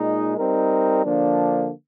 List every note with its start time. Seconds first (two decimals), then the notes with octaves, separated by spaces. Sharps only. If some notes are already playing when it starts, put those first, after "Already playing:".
Already playing: A#2 G#3 D#4
0.36 G3 C4 D#4 A#4
1.03 D3 F3 A#3 D4